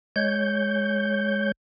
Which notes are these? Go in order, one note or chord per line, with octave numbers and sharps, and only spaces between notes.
G#3 C#5 G6